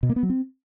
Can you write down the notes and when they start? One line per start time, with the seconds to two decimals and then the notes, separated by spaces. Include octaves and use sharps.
0.03 B2
0.09 A#3
0.16 B3
0.23 F#3
0.30 C4